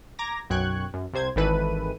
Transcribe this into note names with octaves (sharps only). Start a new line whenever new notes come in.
A#5 D6 G#6 A#6
B1 F#2 G5 C#6 F#6 G#6
F#2
C2 C3 C5 G#6
G#1 D#3 E3 A4 B4 D#7